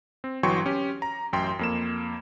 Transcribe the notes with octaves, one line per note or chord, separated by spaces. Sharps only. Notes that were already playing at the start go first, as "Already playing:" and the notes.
C4
G1 E3 F#3 G5 C6 C#6
C#4 G4
A#5
A1 F#2 G5 C6
F2 A#3 E7